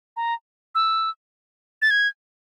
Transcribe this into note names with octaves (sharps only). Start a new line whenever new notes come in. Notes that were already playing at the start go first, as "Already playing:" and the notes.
A#5
E6
A6
G#6